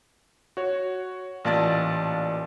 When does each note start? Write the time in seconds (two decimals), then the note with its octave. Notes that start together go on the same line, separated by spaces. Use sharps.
0.57 F#4 C#5
1.45 A1 A#2 D5 F5 A5 A6